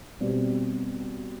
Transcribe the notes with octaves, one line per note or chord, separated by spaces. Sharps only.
B2 G3 C4